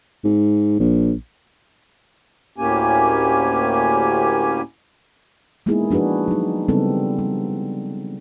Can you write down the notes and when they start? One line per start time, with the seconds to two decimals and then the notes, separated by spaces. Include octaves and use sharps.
0.24 G#2
0.79 A#1
2.58 D2 A2 A#3 C#4 G4 G#5
5.66 G#3 A#3 B3 D#4 E4 G#4
5.90 F3 D4 F#4 G#4 B4
6.28 F#3 D#4
6.68 C#3 G3 B3 C4 D#4 A4
7.19 G3